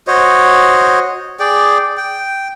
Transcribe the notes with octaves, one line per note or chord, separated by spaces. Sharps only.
F#4 C5 C#5 D#5
G#4 D5 G5
G5